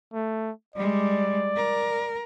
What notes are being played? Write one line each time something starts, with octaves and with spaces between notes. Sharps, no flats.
A3
G3 G#3 D5
A#4